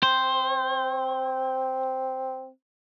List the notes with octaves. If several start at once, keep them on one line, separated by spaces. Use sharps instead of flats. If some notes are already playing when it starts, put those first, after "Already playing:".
C4 C5